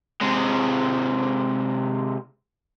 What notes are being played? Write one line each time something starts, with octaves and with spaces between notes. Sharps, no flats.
C3 G#3